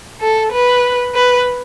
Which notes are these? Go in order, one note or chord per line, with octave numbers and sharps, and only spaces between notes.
A4
B4
B4